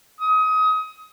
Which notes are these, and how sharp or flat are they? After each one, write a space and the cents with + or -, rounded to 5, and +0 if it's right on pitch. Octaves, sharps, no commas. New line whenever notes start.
D#6 +25